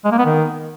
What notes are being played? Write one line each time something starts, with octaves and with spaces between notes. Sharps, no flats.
G#3
A#3
B3
D#3